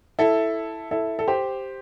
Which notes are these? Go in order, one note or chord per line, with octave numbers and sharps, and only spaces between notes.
E4 A4
E4 A4
A4
G4 C5